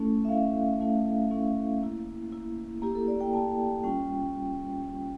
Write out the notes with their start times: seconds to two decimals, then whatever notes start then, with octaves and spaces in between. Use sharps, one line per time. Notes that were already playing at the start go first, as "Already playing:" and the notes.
Already playing: A3 C#4 E4 A4
0.25 E5
0.29 A3 C#4 E4 F5
0.80 A3 C#4 E4
1.30 A3 C#4 E4 A4
1.82 A#3 E4
2.32 A#3 E4
2.82 A#3 E4 G4
2.95 A4
3.08 D5
3.21 G5
3.33 A#3 E4 A5
3.84 G3 C#4 F4 G5